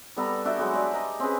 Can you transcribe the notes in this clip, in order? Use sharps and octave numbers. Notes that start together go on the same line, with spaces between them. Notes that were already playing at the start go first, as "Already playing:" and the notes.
G3 B3 A4 A#5
D4 F#4 E5 G5
F#3 G#3 F#4 G#4
G4 D5
D#5 A#5
C4 C#4 G#4 B4